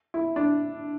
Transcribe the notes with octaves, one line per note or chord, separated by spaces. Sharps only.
E4
D4